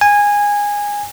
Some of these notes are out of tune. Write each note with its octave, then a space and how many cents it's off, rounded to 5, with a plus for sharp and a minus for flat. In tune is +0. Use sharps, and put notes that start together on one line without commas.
G#5 -15